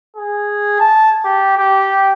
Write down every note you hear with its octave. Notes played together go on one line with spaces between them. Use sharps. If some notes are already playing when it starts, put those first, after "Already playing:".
G#4
A5
G4
G4